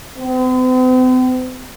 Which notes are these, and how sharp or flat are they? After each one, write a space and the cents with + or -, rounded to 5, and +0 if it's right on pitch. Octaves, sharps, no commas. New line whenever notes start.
C4 -45